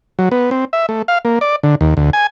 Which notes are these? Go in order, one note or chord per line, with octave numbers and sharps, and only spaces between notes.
F#3
B3
C4
E5
A3
F5
A#3
D5
D3
D#2
D2
G#5